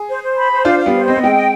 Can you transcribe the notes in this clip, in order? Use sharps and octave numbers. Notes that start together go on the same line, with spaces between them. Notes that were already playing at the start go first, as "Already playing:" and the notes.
Already playing: G#4
C5
C5
B5
C5
D4 F4 F5
F5
G3 B3
C5
C4 D#5
B3
G#3 C4 G5
D#5